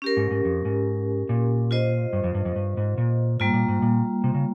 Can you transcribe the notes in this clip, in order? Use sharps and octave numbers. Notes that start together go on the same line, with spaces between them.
C#4 G4 A#4
G#2
G#2
F2
G#2
A#2
F4 C5 D#5
G2
F2
G2
F2
G2
G#2
A#2
G#2 G3 A#3 F4
A#2
G#2
A#2
C3
C#3